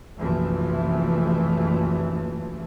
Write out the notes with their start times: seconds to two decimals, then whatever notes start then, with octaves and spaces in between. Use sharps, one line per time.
0.20 F#1 B1 C3 E3 F3 A3